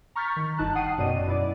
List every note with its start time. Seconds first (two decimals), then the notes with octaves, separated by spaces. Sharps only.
0.15 A#5 C#6 F6 G6 A6 B6
0.36 D#3
0.58 G1 D#4 A5 F#6
0.75 F#5 G5 D#6 C7 D#7
0.98 F#2 B2 D5 D#5 D#7
1.26 F#2 E4 D5